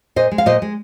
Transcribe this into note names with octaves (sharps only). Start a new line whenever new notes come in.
A#2 C5 D#5
G#3
F5
A#2 C5 D#5
G#3